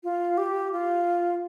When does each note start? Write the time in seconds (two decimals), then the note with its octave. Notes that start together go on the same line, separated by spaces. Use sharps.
0.04 F4
0.38 G4
0.73 F4